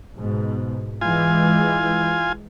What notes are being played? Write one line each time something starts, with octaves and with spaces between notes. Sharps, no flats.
G#2 B2
E3 G#3 F4 G#5